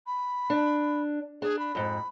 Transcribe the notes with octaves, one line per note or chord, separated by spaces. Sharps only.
B5
D4
D4 G#4
B5
F2 G#2